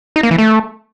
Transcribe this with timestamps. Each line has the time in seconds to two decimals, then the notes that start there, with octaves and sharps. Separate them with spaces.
0.16 D#4
0.23 A#3
0.31 E3
0.38 A3